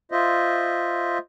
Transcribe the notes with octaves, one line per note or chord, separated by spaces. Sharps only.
F4 C5 D#5 E5